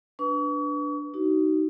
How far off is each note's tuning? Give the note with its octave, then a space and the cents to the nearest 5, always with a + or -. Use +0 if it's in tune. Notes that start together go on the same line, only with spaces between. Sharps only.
D4 +0 B4 +0 C#6 +40
D#4 +5 F#4 +40